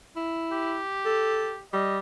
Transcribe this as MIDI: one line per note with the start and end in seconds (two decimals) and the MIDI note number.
0.16 0.81 64
0.52 1.61 67
1.05 1.53 69
1.73 1.99 55
1.73 1.96 75